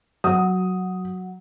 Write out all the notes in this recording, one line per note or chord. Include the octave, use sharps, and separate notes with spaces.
F#3 D#6